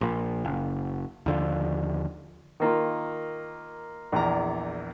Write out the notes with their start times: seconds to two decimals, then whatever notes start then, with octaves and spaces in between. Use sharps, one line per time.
0.01 A#1 A#2
0.45 F#1
1.26 D#2 D3 F3
2.60 D#3 A#3 F4
4.12 A#1 E2 D5 A#5